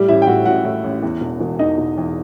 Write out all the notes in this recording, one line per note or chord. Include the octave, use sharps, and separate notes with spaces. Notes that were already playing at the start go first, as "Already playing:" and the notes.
Already playing: A2 G3 G4
A1 E4 E5
G5
A2 F#4 F#5
A1 F#4 F#5
A2
A1
E2
E1
E1
E2 D#4 D#5
E1
E2